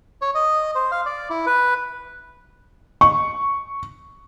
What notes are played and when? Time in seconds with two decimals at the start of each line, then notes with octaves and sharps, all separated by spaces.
0.22 C#5
0.35 D#5
0.75 C5
0.91 F5
1.06 D5
1.30 E4
1.46 B4
3.01 C#6